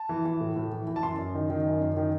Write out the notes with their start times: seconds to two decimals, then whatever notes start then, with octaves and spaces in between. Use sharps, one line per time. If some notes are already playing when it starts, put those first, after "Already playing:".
Already playing: A5
0.09 E3
0.25 E3
0.41 A2
0.56 A2
0.72 E3
0.87 E3
0.96 A5
1.03 F#2 C6
1.18 F#2
1.35 D#3
1.50 D#3
1.66 F#2
1.81 F#2
1.97 D#3